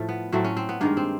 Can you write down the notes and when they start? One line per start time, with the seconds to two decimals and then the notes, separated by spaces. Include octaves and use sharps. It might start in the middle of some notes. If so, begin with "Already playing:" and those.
Already playing: A2 F3 A3
0.09 B3
0.32 A2 F#3 A3 C4
0.44 C#4
0.57 C4
0.69 B3
0.81 G2 D#3 G#3 A#3
0.97 C4